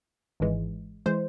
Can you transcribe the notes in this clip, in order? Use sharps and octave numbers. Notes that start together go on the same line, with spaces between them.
G#1 G#2 E3 G#3
E3 G#3 C5